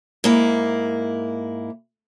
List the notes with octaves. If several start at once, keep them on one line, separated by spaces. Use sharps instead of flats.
G#2 A#3 E4